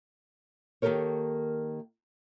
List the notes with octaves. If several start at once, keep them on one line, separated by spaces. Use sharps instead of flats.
D#3 A#3 G4 A4 A#4 C#5